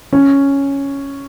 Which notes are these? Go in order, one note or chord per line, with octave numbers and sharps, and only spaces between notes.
C#4